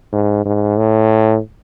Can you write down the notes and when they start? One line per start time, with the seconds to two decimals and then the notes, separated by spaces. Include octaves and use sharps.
0.13 G#2
0.45 G#2
0.78 A2